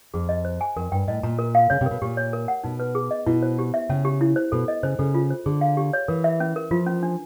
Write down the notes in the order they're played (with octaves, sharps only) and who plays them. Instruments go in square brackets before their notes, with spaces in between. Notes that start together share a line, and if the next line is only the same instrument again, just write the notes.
[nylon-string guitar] F2 [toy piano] G#4
[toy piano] D#5
C5
G#5
[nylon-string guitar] F2 [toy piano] A#4
[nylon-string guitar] G2 [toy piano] G5
[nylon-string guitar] A2 [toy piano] D#5
[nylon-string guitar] A#2 [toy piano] A#5
[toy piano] A#4
F5
[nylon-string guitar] C#3 [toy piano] C#5
[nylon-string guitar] C3
[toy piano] A#4
[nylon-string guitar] B2
[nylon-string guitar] A#2 [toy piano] G4
[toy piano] C#5
A#4
F#5
[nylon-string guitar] B2 [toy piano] D#4
[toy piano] B4
G#4
D#5
[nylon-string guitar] B2 [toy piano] E4
[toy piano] C5
G4
E5
[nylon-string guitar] C#3 [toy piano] C#4
[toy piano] G4
E4
C5
[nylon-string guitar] B2 [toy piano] A4
[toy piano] D#5
[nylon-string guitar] C#3 [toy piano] C5
[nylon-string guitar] C#3 [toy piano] A4
[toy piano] F4
C5
[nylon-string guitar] D3 [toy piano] G#4
[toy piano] F5
G4
C#5
[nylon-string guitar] E3 [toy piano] A#4
[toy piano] E5
C#4
A#4
[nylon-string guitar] F3 [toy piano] F4
[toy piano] C#4
D4